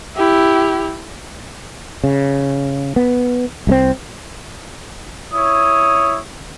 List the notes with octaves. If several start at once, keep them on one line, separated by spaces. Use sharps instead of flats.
E4 G4
C#3
B3
C2 G#3 C4
E4 C#5 D#6